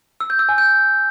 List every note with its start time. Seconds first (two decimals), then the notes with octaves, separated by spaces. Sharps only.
0.20 E6
0.30 G6
0.39 E6
0.49 G#5
0.58 G6